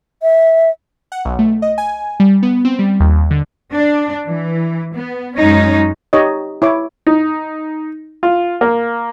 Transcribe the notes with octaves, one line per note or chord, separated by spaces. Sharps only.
E5
F#5
B1
A3
D#5
G#5
G3
B3
C4
G3
D#2
D3
D4
E3
B3
F#2 G#3 C#4 D#4
D#4 G4 C#5 D#5
E4 C#5 D6
D#4
F4
A#3